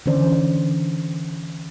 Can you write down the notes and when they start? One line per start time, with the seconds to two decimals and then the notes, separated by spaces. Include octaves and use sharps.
0.06 D3 E3 C#4 C5 D5